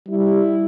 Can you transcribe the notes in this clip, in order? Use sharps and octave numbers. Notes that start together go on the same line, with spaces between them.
G3 E4